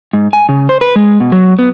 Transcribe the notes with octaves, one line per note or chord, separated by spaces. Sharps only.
G#2
G#5
C#3
C5
B4
G#3
B2
F#3
B3